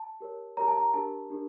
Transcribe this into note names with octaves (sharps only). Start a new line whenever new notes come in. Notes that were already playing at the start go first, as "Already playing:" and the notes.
Already playing: A5
G4 A#4 C#5
G4 A#4 C#5 A#5
A5
A#5
D4 G4 A#4 A5
D4 G4 A#4